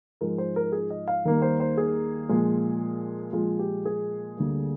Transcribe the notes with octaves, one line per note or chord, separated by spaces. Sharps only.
G#2 F3 G#3 A#4
C5
A#4
G#4
D#5
F5
D#2 D#3 G3 A#3 A#4
C5
C5
G#4
A#2 F3 G#3
A#2 F3 G#3 F4
G4
G#4
D2 D3 G3 A#3